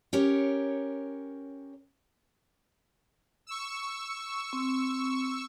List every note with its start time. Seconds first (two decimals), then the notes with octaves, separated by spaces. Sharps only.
0.13 C#4 G4 A#4 C#5
3.47 C#6 E6
4.53 C4